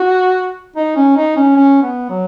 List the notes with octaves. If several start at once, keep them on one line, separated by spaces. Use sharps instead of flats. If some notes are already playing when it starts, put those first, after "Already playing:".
Already playing: F#4
D#4
C#4
D#4
C#4
C#4
B3
F#3